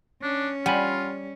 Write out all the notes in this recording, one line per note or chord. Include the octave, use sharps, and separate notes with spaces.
C#4 D4
G3 F4 F#5 G#5 B5